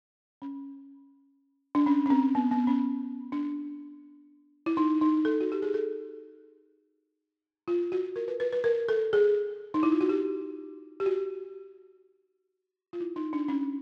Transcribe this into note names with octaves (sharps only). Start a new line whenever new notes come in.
C#4
D4
C#4
C#4
C4
B3
B3
C#4
D4
E4
D#4
D#4
A4
F#4
G4
G#4
A4
F4
F#4
A#4
B4
B4
B4
A#4
A4
G#4
D#4
E4
F4
F#4
G4
G4
F#4
F4
E4
D#4
D4
C#4